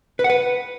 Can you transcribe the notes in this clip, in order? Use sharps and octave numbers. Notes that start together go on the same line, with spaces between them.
B4
F#5
B4